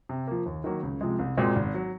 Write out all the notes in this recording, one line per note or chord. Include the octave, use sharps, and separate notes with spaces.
C3
F3 A#3
D#2
D#3 F#3 A#3
C#2
C3 F3 G#3
C2
A#2 G#3 C4 F#4
G#1
F#3